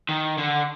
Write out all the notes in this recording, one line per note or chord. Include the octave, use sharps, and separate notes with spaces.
D#3
D3